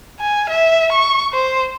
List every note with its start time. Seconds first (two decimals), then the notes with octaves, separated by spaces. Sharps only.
0.19 G#5
0.49 E5
0.92 C#6
1.33 C5